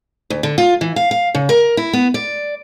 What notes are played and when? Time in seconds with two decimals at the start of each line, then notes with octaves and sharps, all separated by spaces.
0.30 D2
0.43 D3
0.58 F4
0.81 E3
0.96 F5
1.11 F5
1.35 C#3
1.49 A#4
1.77 E4
1.93 B3
2.14 D5